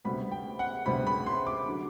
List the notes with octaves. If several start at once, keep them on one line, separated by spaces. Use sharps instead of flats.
D2 C3 G3 B3 B5
G5
F#5
D2 C3 G3 B3 B5
B5
C6
D6
D3 F#3